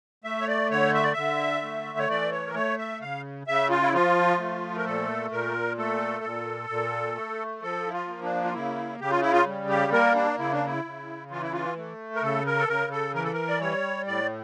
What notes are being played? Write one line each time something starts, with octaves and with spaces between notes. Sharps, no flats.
A3 E5
C#5
D5
D3 C#5
E5
D5
D3 E5
A3
C#5
E3 D5
C#5
A#4
A3 C#5
E5
C#3 F5
C#3 E5
F4
E4
F3 F4
A3
A#4
A#2 A4
A#2 A#4
A3 A4
A#2
A#2
A3
F3 A4
E4
F4
A#3
D4
F4
C#3 E4
C#3 G4
F4
E4
F4
G3
G4
A#3 A#4
D4
C#3 E4
D4
E4
C#3
E3 F4
E4
F4
A3
A#4
C#3 A4
A#4
A4
C#3 A#4
A4
E3 A#4
A4
A#4
D5
G3 C#5
A2 D5